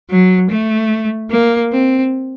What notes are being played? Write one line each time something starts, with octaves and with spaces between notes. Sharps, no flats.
F#3
A3
A#3
C4